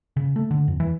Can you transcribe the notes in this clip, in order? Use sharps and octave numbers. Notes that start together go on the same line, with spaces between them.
C#3
A3
D3
F2
E3